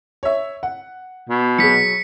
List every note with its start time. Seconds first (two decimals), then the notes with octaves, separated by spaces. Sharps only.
0.23 C#5 E5
0.63 F#5
1.29 B2
1.59 F#3 G#4 B6 C#7